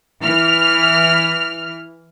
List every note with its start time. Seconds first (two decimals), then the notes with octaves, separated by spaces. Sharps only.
0.23 E3 F6